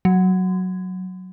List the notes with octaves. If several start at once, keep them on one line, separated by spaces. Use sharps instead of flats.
F#3